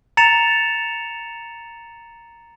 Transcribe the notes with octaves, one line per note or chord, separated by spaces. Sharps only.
A#5 A6 C#7 E7 F7